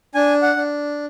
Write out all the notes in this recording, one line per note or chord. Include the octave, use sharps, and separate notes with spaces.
D4 G#5
F#5
D4